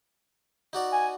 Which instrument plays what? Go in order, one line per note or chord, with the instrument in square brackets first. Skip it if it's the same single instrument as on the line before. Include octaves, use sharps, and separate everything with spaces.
[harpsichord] D#4 F#4 D5
[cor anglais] G#5